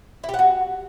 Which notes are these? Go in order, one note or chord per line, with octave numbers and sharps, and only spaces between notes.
E4
G4
F#5
F#4